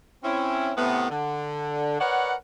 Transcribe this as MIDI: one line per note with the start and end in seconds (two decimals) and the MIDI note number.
0.24 0.72 60
0.24 0.72 61
0.24 0.72 64
0.77 1.09 45
0.77 1.09 48
0.77 1.09 57
0.77 1.09 59
1.10 1.99 50
2.00 2.33 70
2.00 2.33 71
2.00 2.33 73
2.00 2.33 74
2.00 2.33 78